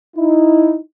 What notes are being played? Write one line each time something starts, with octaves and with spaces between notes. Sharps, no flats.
D#4 E4